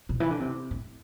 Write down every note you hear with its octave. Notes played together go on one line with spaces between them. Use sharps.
B2
E3
D3
C3
A2